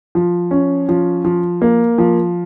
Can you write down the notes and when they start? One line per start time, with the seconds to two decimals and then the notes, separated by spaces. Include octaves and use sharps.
0.15 F3
0.51 C#4
0.89 F3
1.25 F3
1.62 A#3
1.98 F3